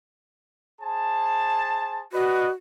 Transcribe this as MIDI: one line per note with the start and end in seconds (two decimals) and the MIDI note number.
0.80 2.03 68
0.80 2.03 72
0.80 2.03 81
2.12 2.50 66
2.12 2.47 71
2.12 2.47 74
2.12 2.47 75